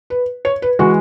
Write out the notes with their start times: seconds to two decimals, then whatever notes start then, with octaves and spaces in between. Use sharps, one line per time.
0.10 B4
0.45 C#5
0.62 B4
0.79 E3 G#3 F#4